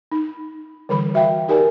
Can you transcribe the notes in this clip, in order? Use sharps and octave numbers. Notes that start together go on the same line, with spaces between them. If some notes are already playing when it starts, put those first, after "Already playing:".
D#4
D3 E3 G3 A4 B5
F#4 E5 F5 G5
D#4 G4 A#4 D5 G#5